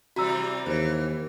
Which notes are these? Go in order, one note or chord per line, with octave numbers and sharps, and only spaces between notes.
C3 E3 G3 F#4 A#5 E6
D#2 E3 C5